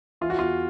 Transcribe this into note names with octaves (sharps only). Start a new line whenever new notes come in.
E3 F4
F#4
E2 F4